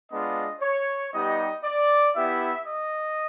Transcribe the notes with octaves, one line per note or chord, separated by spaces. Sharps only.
G#3 B3 D4 F4 D#5
C#5
G3 B3 D#4 G4 D#5
D5
B3 E4 G4 E5
D#5